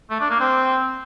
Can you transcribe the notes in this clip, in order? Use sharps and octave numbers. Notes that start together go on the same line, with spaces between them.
A3
D4
A#3
C4